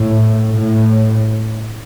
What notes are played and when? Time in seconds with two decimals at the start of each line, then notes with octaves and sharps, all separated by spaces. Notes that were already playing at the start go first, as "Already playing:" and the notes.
Already playing: A2
0.52 A2